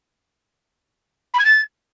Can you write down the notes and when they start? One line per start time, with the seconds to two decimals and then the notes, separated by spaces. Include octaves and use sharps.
1.33 B5
1.39 G#6
1.44 A6